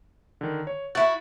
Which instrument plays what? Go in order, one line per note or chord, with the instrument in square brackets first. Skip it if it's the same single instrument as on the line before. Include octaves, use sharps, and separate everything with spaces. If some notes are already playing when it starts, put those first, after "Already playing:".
[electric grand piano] D3 D#3
C#5
[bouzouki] E4 F#4 [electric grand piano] A6